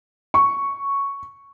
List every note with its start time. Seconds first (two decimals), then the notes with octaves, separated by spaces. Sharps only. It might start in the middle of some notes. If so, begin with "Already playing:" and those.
0.34 C#6